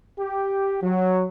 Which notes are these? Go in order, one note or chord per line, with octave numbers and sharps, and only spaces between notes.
G4
F#3